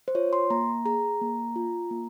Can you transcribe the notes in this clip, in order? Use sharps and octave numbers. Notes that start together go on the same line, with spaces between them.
C5
F4 C#5
C6
A#3 A#5
G#4 A#5
A#3
F4
A#3